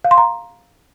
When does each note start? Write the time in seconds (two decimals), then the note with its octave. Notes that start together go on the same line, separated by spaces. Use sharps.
0.05 F5
0.11 C6
0.18 A#5